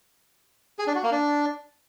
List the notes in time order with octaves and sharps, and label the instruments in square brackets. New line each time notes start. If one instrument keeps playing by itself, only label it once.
[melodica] G#4
D4
F#4
A#3
D4